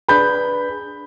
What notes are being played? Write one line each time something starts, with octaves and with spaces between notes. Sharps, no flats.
D4 G#4 B4 B5 G6